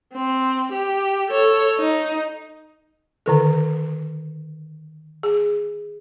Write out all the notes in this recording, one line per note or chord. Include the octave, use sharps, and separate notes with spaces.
C4
G4
A4 C#5
D#4
D3 D#3 A4
G#4